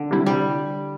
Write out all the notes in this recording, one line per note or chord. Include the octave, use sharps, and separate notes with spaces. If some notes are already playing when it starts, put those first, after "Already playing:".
Already playing: D3
C3 G3 E4
C3 G3